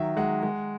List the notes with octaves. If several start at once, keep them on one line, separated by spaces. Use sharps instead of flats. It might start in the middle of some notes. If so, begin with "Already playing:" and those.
Already playing: D#3 F#3 E5
G#3 F#5
G#3